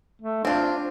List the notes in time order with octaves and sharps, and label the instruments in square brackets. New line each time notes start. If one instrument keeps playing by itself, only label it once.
[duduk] A3
[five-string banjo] C4 F4 [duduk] D4